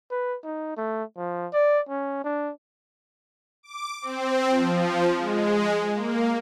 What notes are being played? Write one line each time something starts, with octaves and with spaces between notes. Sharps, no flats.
B4
D#4
A3
F3
D5
C#4
D4
D6
C4
F3
G#3
A#3